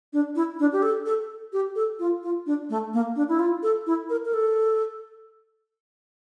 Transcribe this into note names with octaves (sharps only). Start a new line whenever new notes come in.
D4
E4
D4
G4
A4
A4
G4
A4
F4
F4
D4
A3
A#3
D4
E4
F4
A4
E4
A#4
A#4
A4